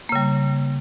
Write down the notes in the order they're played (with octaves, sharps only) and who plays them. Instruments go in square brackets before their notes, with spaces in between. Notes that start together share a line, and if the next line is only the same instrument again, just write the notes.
[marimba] A#3
C#3
G3